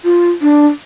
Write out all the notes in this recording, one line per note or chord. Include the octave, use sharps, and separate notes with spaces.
F4
D4